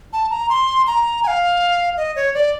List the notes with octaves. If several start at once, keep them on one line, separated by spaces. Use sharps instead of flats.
A5
A#5
C6
A#5
G#5
F5
D#5
C#5
D5